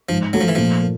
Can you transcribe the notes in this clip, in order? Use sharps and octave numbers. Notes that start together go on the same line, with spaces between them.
G#2 F3
F#3 A3
F3
E3
A#2 F3
A#3